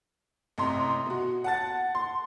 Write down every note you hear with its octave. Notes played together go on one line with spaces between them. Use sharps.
A1 C3 A#5 C6
B2 F#4
F#5 A5 A6
C6